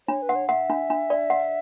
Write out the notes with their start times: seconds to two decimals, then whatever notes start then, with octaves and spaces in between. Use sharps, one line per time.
0.08 D4 C#5
0.22 B4
0.29 F#5
0.35 C#5
0.49 E5 F#5
0.70 D4
0.90 D4
1.10 D5
1.30 F#5